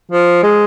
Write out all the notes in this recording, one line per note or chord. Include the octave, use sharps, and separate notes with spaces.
F3
G#3